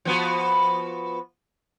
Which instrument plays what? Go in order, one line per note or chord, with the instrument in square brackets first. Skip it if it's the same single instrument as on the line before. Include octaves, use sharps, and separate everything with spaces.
[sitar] F3 B3 F#4